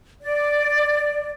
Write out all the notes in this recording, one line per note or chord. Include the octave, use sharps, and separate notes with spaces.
D5